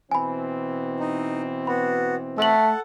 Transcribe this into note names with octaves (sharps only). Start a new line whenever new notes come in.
B2 E3 C4 G#5 B5
D#4
B3 F#4 B5
A3 A4 F#5 E6 F#7